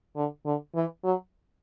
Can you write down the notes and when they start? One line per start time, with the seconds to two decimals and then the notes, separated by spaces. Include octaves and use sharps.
0.16 D3
0.46 D3
0.75 E3
1.04 F#3